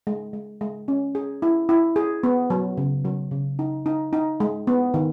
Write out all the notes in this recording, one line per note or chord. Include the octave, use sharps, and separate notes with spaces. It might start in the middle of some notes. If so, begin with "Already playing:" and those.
G#3
G#3
G#3
C#4
G#4
E4
E4
G#4
B3
F#3
C#3
F#3
C#3
D#4
D#4
D#4
G#3
B3
D#3